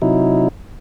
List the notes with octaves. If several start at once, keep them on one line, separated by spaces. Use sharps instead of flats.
C3 F#3 D#4 E4